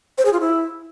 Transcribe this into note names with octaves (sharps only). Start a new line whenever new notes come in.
C5
G#4
F4
E4